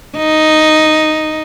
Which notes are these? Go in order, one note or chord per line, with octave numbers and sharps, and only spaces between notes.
D#4